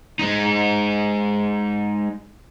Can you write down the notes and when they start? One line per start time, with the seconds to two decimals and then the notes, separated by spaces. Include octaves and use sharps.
0.19 G#3 D#4